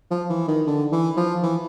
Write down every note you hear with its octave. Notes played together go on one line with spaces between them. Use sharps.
F3
E3
D#3
D3
E3
F3
E3